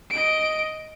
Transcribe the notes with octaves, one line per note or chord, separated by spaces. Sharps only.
D#5 D7